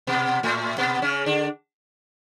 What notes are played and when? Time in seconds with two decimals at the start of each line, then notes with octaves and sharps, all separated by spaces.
0.07 B2 B3
0.43 A2 A3
0.78 B2 B3
1.02 C#3 C#4
1.26 D3 D4